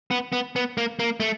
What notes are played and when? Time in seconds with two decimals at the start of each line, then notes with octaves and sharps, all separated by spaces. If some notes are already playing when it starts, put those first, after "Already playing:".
0.11 B3
0.32 B3
0.56 B3
0.78 A#3
0.99 A#3
1.20 A3